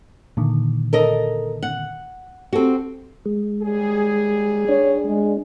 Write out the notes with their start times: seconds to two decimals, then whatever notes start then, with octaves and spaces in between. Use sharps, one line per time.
0.37 A#2 D3 D#3
0.93 A4 A#4 D#5
1.63 F#5
2.53 C4 F#4 G4 A4
3.26 G#3
3.62 D#2 G3 G#4
4.69 D4 C#5
5.06 G#3